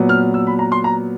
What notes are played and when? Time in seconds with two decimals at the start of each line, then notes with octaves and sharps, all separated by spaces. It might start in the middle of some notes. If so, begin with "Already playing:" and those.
Already playing: A#2 F#3 B3
0.09 F6
0.34 E6
0.47 B5
0.59 A#5
0.72 C6
0.84 A#5